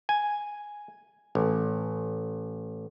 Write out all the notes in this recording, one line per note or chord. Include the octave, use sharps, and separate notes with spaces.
G#5
A1